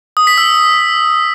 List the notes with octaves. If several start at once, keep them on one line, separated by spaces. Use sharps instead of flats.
D#6
B6
E6